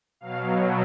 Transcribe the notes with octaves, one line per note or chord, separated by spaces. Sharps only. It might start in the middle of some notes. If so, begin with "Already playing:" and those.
B2 F#3 F5